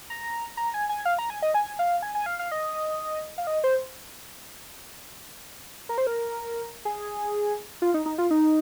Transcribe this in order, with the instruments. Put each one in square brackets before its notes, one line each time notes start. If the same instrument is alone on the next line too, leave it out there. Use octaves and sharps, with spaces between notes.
[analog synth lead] A#5
A#5
G#5
G#5
F5
A#5
G#5
D#5
G#5
F5
G#5
G#5
F5
F5
D#5
F5
D#5
C5
A#4
C5
A#4
G#4
F4
D#4
D#4
F4
D#4